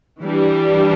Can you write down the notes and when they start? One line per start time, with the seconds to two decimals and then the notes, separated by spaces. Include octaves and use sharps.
0.22 E3 G3 D4